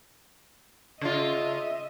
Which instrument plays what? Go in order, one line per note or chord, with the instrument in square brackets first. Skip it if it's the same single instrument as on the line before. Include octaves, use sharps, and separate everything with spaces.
[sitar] C#3 F4 [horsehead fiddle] D#5 E5